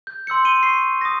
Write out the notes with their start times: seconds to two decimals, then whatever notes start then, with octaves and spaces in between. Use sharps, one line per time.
0.07 G6
0.27 C6 E6 G6 C#7
0.44 C6 C#7 D#7 G7
0.63 C#6 C7
1.01 D#6 A#6